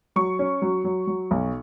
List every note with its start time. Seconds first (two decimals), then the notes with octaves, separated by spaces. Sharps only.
0.16 F#3 C#6
0.39 C#4
0.62 F#3
0.84 F#3
1.07 F#3
1.31 B1